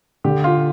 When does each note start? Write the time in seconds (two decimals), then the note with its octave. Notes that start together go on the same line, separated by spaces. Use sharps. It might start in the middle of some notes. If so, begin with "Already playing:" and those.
0.24 D3 G4
0.44 F4